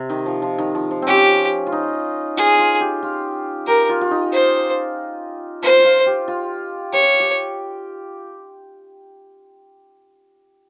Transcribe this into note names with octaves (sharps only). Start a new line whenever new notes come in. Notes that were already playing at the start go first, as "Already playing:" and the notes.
Already playing: C3
D#3
F3
F3
D#3
F3
F3
C4 C#4 G4
F4
D#4
F4 G#4
F4
G4
F4
G4 A#4
F4
F4
D#4
C5
F4 C5
F4
G4
F4
G4 C#5
G4